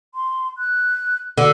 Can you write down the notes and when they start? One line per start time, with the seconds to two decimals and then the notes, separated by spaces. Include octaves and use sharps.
0.15 C6
0.58 F#6
1.38 D3 F#4